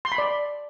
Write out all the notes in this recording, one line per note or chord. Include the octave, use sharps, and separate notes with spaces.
C6
B5
D5